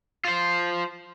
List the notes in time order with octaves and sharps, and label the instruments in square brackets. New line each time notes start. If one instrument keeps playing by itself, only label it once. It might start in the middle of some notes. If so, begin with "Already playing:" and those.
[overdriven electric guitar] F4 C5